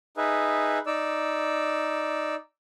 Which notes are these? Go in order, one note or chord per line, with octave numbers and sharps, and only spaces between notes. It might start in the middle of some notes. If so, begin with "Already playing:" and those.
D#4 G#4 B4 E5
D#4 D5 E6